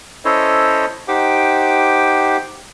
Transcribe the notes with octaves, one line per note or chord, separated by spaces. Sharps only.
C#4 E4 A4 C5 C#5 D#5
D#4 G4 C5 F#5 G5 D6